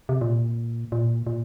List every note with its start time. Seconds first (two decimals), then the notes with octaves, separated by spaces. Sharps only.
0.09 C3
0.21 A#2
0.92 A#2
1.27 A#2